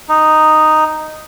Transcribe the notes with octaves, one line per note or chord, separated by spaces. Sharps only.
D#4